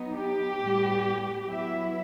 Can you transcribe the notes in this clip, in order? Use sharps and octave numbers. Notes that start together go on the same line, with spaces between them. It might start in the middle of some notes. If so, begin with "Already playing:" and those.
Already playing: F#3 B3 D#4
G4
A2 G3 B3
F#3 B3 E4 E5